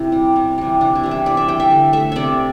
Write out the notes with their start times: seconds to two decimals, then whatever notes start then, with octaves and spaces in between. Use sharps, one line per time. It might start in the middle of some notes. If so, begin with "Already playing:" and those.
Already playing: C3 E4
0.12 G3
0.36 C3
0.58 E3 G3
0.81 C3 D4
0.95 E4
1.03 E3 G3
1.11 E5
1.26 C3 D5
1.37 E5
1.48 G3 G5
1.60 E5
1.71 D3
1.93 A3 E5
2.12 C3 D5 E5